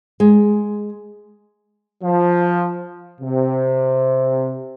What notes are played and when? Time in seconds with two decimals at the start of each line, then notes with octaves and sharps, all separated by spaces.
0.20 G#3
2.04 F3
3.20 C3